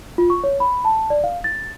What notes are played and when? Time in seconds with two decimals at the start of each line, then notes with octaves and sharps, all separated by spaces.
0.18 F4
0.30 C#6
0.44 C#5
0.60 B5
0.85 A5
1.10 D5
1.24 F5
1.44 A6